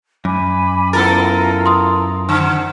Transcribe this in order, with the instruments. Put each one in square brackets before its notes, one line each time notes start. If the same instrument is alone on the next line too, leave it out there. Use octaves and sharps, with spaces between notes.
[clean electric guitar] F#2 [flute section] G#5 B5 D6
[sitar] B3 A4 A#4 [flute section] E4 F4 A#5 [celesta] A6
[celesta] C6 D#6
[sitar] D3 [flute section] C5 F#5